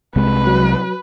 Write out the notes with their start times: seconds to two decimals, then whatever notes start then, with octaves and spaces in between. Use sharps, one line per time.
0.16 C2 C3 G#3 B4
0.47 F#3